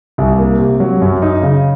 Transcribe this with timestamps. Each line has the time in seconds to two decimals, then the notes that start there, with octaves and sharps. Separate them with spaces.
0.18 C2
0.38 A#3
0.59 C3
0.80 F#3
1.02 F#2
1.22 D#4
1.42 C#3